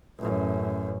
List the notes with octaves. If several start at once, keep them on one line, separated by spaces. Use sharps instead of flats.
A1 F#2